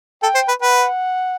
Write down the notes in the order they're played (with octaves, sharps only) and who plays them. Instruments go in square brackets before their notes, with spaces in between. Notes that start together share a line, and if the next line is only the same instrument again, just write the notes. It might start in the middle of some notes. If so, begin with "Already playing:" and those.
[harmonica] A4 [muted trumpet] G5
[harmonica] C5
B4
[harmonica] B4 [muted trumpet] F#5